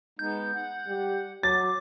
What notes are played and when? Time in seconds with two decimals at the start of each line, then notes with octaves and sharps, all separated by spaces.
0.19 G#3 B3 D#4 G6
0.55 F#5
0.88 G3
1.43 F#3 D6 A6